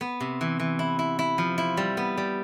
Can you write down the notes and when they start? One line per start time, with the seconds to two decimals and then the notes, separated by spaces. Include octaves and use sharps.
0.01 B3
0.20 C3
0.41 E3
0.59 E3
0.79 E4
0.99 E4
1.19 E4
1.38 F3
1.58 E4
1.77 G3
1.97 B3
2.17 G3